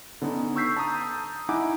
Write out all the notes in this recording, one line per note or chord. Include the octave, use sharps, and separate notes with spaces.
D3 B3 C#4 D#4
C#6 E6 G6 B6 C7
A5 A#5 D#6
D#4 E4 F#5 G#5 D6